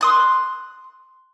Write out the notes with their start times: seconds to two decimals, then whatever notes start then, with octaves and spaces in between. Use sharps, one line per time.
0.01 C6 D#6 F#6